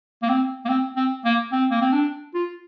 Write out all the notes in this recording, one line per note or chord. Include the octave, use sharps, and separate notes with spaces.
A#3
C4
A#3
C4
C4
A#3
C4
A#3
C4
D4
F4